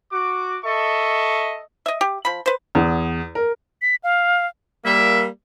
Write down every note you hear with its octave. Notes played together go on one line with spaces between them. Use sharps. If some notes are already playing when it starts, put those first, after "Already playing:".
F#4 D6
A4 D#5 E5 C#6
D#5 E5
G4
F3 B5
B4 C5
E2
A#4
B6
F5
G3 A#3 E5